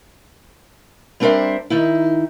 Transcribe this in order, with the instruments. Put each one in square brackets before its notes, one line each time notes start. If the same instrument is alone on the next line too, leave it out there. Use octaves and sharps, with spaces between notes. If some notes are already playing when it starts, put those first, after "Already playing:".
[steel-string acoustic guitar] G3 C4 D4 A#4 C5 E5
D#3 D#4 E4